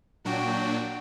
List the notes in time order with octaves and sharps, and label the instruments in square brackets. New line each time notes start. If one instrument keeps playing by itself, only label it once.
[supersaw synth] A#2 F#3 D4 [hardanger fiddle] F#4 G5